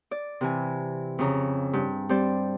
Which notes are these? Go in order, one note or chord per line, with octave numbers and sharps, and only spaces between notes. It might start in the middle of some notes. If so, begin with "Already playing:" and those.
D5
C3 E3 G#5
F2 C#3 A#5
G2 G5
G3 C4 C5 D5